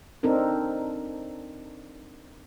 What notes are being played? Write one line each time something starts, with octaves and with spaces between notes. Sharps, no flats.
C4 D4 D#4 A4 A#4